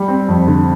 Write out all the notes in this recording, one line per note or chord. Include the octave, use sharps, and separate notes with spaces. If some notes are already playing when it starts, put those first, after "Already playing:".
Already playing: G3
C4
F2
D3